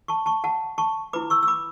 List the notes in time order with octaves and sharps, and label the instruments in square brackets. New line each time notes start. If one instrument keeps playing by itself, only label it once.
[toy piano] A5 C#6
A5 C#6
F#5 A5
A5 C#6
E4 B4 B5 D6
C#6 E6
E6
B5 D6